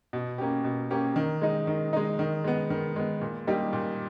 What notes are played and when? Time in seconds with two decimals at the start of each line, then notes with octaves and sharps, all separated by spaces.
0.13 B2
0.38 A#3 C#4 G4
0.64 B2
0.91 A#3 C#4 G4
1.16 D#3
1.42 G#3 D#4
1.67 D#3
1.93 G#3 D#4
2.19 D#3
2.44 G#3 B3
2.70 D#3
2.96 G#3 B3
3.21 A#2
3.47 G3 A#3 D#4 G4
3.73 A#2